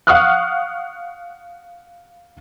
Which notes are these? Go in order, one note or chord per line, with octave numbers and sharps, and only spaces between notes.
F5 F#5 C#6 D#6 F6 F#6